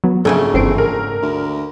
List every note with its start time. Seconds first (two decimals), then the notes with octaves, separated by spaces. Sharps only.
0.04 F#3 B3
0.25 A#1 G#2 C#3 A3 A4 G#5
0.54 G1 E3 C4 C7 D7
0.78 A#4
1.22 D2